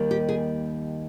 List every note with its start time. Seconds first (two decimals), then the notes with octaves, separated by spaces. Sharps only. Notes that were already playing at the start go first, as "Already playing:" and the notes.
Already playing: D#2 D#3 G3 A#3
0.11 G4
0.29 G#4